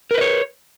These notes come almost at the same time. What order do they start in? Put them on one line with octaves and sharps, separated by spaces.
A#4 B4 D#5 C#5